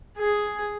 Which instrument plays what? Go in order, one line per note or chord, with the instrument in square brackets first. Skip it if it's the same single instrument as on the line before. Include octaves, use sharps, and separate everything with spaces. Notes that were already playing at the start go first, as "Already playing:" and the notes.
[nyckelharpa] G#4